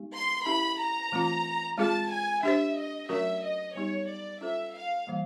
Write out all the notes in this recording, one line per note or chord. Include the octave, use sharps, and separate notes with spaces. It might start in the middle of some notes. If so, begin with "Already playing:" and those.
Already playing: G#3 B3 D#4 G4
C6
C#4 E4 G4 B4 E5 B5
A#5
E3 A3 C4 F4
G#3 C4 F4 G#4 A5
G#5
D4 G4 C5 E5
D#5
F#3 A3 C#4 F#4 A#4 E5
D#5
G3 B3 D#4 G4 C#5
D5
C#4 F4 A4 C5 E5
F5
E3 G3 A#3